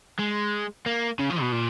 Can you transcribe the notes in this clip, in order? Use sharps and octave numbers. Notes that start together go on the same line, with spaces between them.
G#3
A#3
C#3
F3
B2
A#2